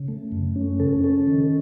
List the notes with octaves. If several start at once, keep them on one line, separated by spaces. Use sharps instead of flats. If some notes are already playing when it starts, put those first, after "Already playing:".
Already playing: C#3
A3
F#2
C#4
C#3 A4
C#4 A4
D#3